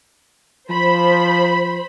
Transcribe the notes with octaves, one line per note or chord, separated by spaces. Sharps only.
F3 C5 B5